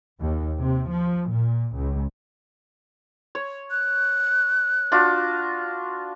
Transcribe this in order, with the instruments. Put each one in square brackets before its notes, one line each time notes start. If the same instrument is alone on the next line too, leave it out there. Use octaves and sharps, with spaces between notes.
[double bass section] D#2
C3
F3
A#2
C#2
[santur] C#5
[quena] F#6
[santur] D4 F4 F#4